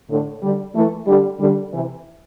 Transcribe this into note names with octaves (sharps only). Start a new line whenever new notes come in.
A2 D3
D3 G3
E3 A3
D3 G3
D3 G3
C3 E3